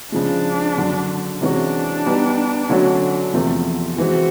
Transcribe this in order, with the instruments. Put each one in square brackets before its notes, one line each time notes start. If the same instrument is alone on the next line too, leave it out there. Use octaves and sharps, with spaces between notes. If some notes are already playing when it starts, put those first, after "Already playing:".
[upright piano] C#3 F3 G#3 [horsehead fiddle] D4
[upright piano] F#2 D3 F#3
[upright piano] C3 E3 G#3 C#4 F#4 [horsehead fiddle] D4
[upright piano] G3 B3 D#4 G4
D3 F#3 A3 C#4 F#4
E2 C3 F3 A3
[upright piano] E3 G#3 C4 [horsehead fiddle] F#4